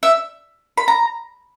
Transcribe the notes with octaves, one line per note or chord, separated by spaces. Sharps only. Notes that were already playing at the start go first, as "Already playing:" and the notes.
E5
B5
A#5